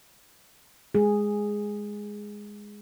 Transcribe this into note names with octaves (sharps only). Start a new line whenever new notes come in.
G#3 G#4